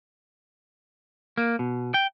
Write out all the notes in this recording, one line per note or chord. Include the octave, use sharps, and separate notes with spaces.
A#3
B2
G5